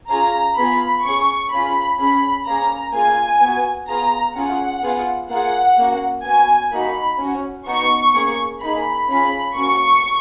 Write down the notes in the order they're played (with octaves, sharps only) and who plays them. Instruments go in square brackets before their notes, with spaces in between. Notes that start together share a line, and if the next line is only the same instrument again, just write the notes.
[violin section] C#4 F4 G#4 A#5
B3 F4 G#4 B5
C#4 G#4 C#6
C#4 F4 G#4 B5
C#4 G#4 B5
A#3 C#4 G#4 A#5
A#3 F4 G#4 G#5
B3
F#4
B3 F4 G#4 A#5
C#4 F4 G#4 F#5
B3 F4 G#4
A#3 F4 G#4 F#5
A#3 C#4 F#4
B3 F#4 G#5
A#3 D#4 F#4 B5
C#4 F#4
B3 D#4 F#4 C#6
A#3 C#4 G#4
A#3 D#4 G#4 B5
C#4 F4 G#4 B5
A#3 C#4 F#4 C#6